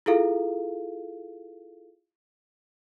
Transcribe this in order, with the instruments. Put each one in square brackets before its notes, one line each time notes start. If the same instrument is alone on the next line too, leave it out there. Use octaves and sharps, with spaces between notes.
[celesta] E4 F4 G#4 A4 F5